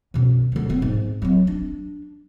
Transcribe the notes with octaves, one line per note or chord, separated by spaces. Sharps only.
F#2 B2
D2 D3
B3 C4
G#2
F#3 C4
D4